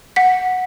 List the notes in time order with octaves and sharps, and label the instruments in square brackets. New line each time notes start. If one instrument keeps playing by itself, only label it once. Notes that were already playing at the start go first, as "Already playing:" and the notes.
[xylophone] F#5 B6